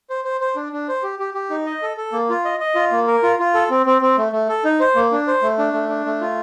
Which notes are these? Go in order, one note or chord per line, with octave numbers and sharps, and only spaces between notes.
C5
C5
C5
D4
D4
C5
G4
G4
G4
D#4
D#5
A4
A4
A#3
F4
D#5
D#5
F4
A#3
A#4
F4
F4
A4
C4
C4
C4
A3
A3
A4
D#4
C5
A#3
D4
C5
A3
D4
A3
D4
A3
F4